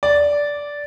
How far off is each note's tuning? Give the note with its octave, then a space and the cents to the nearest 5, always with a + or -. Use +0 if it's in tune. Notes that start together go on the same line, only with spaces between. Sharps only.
D5 -10